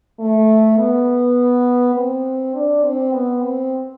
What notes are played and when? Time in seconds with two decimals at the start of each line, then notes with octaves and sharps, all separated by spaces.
0.19 A3
0.77 B3
1.95 C4
2.54 D4
2.83 C4
3.13 B3
3.42 C4